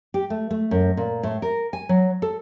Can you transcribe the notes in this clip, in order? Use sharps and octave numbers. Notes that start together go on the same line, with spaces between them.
G4
A3
A3
F#2
A#2
A2
A#4
G#5
F#3
A4